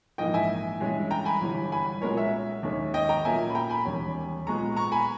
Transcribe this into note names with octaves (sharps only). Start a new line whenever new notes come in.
A#1 G#2 E3 A#3 D#5 G5
E5 G#5
G2 E3 G#3 C#4
G5 A#5
G#5 B5
G1 G2 E3 G3
G#5 B5
B1 A#2 G#3 C#4 A#4 C#5
C#5 E5
D#2 D#3 G#3 C#4
D#5 G5
G5 A#5
B1 A#2 A#3 C#4 E5 G#5
B5
G5 A#5
G#5 B5
E1 D#2 D#3 G3 C#4
B1 A#2 G#3 B3 A#5 C#6
A#5 C#6
G#5 B5